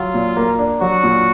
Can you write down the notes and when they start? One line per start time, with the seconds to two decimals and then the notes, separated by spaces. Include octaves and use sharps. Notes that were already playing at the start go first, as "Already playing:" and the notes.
Already playing: F#3 F4
0.14 A#2
0.37 A#3
0.59 D4
0.81 F#3 F#4
1.04 A#2